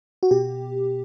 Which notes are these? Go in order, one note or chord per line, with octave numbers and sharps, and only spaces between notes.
F#4
B2 G4